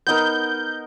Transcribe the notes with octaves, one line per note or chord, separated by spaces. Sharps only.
B3 D#4 A#4 G6